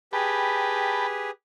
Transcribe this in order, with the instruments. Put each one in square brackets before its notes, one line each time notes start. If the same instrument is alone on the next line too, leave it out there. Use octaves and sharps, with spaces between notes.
[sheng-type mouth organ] G4 G#4 B4 [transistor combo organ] G5 A5 B5